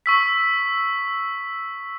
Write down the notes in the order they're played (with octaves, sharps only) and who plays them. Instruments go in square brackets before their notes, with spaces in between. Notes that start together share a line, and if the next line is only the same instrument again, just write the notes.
[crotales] C#6 E6 B6